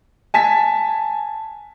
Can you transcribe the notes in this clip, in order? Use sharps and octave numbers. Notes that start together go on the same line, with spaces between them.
G#5 A5 B6